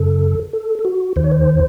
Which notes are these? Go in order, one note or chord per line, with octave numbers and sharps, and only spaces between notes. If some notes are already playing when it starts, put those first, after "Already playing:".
Already playing: F#2 C#3 A4
A4
A4
F#4
D#2 D#3 C5
C#5
C5